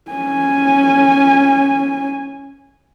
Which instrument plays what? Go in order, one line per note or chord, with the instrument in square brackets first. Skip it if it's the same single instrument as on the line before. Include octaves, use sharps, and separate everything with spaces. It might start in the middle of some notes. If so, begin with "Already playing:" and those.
[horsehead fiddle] C#4 G#5